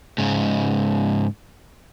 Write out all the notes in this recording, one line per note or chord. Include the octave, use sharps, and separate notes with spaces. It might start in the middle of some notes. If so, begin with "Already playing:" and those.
G#2 C#3